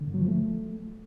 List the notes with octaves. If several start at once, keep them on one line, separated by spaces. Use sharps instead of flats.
D3
G2
F#3
F3
A3